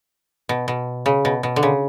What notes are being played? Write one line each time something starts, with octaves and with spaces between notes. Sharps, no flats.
B2
B2
C#3
B2
B2
D3
C#3